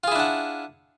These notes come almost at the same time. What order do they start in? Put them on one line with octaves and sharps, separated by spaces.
F4 G#4 E4 D4 F#5